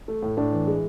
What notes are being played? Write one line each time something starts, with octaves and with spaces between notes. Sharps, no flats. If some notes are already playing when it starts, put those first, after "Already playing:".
A3
A2
A2 D4
E3
G#3